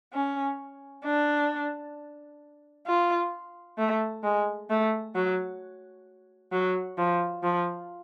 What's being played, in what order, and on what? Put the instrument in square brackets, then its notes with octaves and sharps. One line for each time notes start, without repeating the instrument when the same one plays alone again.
[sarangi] C#4
D4
F4
A3
G#3
A3
F#3
F#3
F3
F3